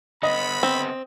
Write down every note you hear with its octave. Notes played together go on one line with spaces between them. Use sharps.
D3 B3 D#5 B5
C4